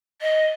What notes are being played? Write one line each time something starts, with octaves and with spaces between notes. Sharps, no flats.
D#5